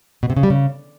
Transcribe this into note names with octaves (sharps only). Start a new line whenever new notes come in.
B2
C3
C#3
G3
C#3